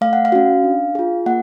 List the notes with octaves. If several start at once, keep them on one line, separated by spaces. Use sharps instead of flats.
A3 F5
F#5
F5
C#4 F#4
D4
F4 G#4
A#3 F#5